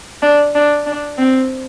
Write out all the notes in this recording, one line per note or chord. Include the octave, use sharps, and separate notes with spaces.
D4
D4
D4
C4